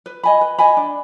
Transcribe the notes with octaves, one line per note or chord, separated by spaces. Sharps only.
B4
D#5 G#5 B5
B4
D#5 G#5 B5
D4